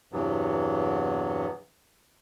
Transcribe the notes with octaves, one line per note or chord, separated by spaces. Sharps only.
E2 G2 C3 E3 F#3 B3